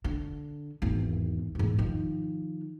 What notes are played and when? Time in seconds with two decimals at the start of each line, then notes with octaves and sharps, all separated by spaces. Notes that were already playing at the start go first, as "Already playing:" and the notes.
0.04 D3
0.82 G#1 E2
1.55 E2 G#2
1.79 D#3 F3